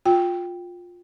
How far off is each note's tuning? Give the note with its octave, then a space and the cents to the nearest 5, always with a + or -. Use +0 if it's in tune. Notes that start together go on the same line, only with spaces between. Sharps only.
F4 +15 G5 +0